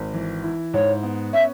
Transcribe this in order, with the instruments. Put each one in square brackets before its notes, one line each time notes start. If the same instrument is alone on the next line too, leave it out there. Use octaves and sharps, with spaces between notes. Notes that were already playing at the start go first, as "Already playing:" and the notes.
Already playing: [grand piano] G#1
E3
E4
[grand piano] G#2 [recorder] C#5
[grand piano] B3
[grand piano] C#4 [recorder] E5